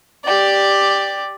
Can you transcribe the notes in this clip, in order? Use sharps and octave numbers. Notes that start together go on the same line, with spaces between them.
G4 D5